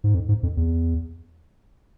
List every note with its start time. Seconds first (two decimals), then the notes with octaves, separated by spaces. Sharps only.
0.04 G#2
0.15 F2
0.29 G#2
0.43 F2
0.57 E2